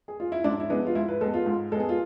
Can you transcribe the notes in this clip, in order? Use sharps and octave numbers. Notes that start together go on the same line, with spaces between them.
G#4
F4
E4
G#2 D4
E4
G#3 B3 D4
F4
G#2 E4
B4
G#3 B3 A4
F4
G#2
G#3 B3 G#4 A4
F4